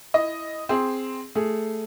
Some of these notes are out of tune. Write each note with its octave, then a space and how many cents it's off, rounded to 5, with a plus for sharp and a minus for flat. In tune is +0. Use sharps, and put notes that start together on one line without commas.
E4 +0 D#5 +0
C4 +0 G#4 +0
A3 +0 G#4 +0